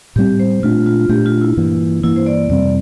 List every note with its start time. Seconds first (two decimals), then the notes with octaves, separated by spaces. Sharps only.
0.16 A2 G3 C4 G4
0.39 C5
0.63 A#2 A3 D4 F4
0.86 F4
1.09 A#2 A3 D4 G4
1.26 F4
1.41 E4
1.57 G2 E3 A#3
2.03 G2 E3 A#3 E4
2.16 C5
2.26 D5
2.50 F2 C3 G3 C4 D5